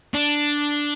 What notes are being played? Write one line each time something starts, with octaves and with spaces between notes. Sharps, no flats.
D4